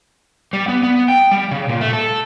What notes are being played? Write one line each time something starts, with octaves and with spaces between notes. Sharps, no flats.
G3
B3
B3
G5
G3
C#3
A#2
A3
A4